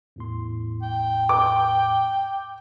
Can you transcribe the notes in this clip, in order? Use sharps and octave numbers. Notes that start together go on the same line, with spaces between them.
E2 A2 C6
G5
D6